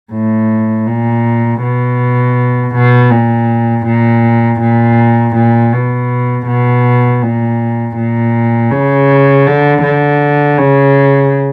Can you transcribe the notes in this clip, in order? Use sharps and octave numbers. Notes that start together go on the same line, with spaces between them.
A2
A#2
B2
B2
A#2
A#2
A#2
A#2
B2
B2
A#2
A#2
C#3
D3
D3
C#3